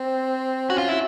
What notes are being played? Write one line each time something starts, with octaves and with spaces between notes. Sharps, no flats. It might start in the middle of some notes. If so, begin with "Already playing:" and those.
Already playing: C4
C#4 F#4
F4
E4